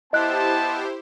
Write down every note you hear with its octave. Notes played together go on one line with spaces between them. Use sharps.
B3 E4 G4 C5 D#5 A5 F#6